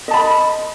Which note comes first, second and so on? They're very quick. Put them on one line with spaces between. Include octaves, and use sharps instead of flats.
D#5 A5 B5